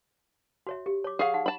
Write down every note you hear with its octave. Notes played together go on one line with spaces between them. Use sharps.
F#4 C#5 E5
G4
C#5 D6
G#4 C#5 F5 F#5 C#6
D#4 F#5
A5 B5